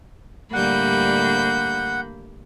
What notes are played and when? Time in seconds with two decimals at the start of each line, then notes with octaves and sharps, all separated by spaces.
0.53 A2 D3 G3 A#3 F#5 B5 G6